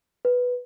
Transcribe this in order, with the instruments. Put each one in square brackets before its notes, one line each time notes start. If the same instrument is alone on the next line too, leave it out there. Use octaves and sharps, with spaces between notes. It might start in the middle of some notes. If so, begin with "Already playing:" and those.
[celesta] B4